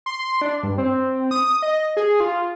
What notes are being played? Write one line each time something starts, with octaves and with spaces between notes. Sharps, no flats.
C6
D4
G2
C4
D#6
D#5
G#4
F4